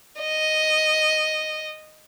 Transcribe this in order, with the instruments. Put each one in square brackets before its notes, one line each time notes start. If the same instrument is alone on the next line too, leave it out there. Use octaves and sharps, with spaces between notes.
[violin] D#5